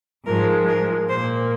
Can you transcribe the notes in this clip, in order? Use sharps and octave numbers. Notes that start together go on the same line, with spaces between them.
G#2 F3 G#3 A#4
A#4
A#2 A#3 C5